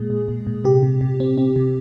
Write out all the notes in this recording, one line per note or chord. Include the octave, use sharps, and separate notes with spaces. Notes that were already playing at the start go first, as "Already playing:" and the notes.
Already playing: A#2 G#3 G#4
A#2
A#2
A#2
C3 G4
C3
C3
C4
C4
C3